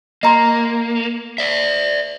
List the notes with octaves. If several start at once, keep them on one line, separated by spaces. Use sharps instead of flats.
A#3 D#5 A#5 C6
D5 E5